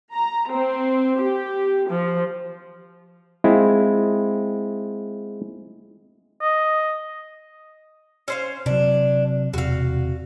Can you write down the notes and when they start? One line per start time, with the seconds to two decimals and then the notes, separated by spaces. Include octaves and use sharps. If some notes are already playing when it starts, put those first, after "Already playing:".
0.13 A#5
0.49 C4
1.19 G4
1.88 F3
3.44 G#3 C4 E4 F4
6.42 D#5
8.28 C#4 C5 F5
8.66 C3 F#3 D4
9.54 E1 C3 F#4 F5